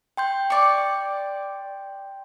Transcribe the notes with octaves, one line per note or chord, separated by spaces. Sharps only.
G5 C6 G6
D5 C#6